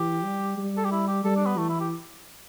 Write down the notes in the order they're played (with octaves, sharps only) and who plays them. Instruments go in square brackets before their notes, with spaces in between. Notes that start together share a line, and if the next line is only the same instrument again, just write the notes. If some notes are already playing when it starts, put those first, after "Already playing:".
Already playing: [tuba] E3 [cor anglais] G4
[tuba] G3
G3
[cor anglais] A4
G4
E4
G4
[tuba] G3 [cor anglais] A4
[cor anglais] D4
B3
[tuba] E3 [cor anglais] A3
[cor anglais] E4
G4